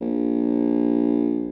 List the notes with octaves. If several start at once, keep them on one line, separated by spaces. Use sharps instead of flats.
A#1